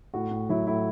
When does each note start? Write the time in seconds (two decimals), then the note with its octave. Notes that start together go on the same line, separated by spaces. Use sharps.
0.14 A2 F#4
0.31 A2
0.49 F#3 E4
0.67 A2 E4